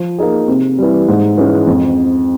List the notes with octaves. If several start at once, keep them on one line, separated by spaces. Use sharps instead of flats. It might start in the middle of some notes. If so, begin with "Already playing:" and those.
Already playing: F3
A#3 D#4 G#4
C3
E3 G3
G#2
E3 G#3 C#4
F2